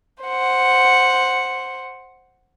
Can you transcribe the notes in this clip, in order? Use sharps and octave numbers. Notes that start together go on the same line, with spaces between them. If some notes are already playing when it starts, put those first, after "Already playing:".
C5 F#5